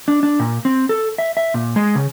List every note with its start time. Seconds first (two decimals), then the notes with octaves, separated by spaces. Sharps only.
0.08 D4
0.23 D4
0.40 A#2
0.65 C4
0.89 A4
1.18 E5
1.37 E5
1.54 A#2
1.76 G#3
1.95 C#3